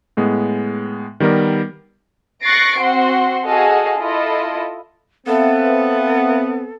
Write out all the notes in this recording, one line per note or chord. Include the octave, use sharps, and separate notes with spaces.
A2 G#3 B3
D#3 G3 B3 A#4 D5
C#6 F#6 A6 A#6 C7 D7
C4 F#4 F#5 C6
F#4 G#4 A4 D#5 F5
E4 F4 A4 D#5
B3 C4 A4 E5 F5